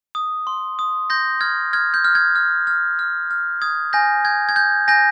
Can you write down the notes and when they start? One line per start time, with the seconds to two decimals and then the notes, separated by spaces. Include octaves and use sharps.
0.15 D#6
0.47 C6
0.79 D#6
1.10 C6 G6 A#6
1.41 F6 G#6
1.73 F6 G#6
1.94 G6
2.04 F6
2.15 G#6
2.36 F6
2.67 F6
2.99 F6
3.31 F6
3.62 D#6 G#6
3.93 G#5 G6 A#6
4.25 G6 G#6
4.49 G#6
4.56 G6
4.88 G#5 G6 A#6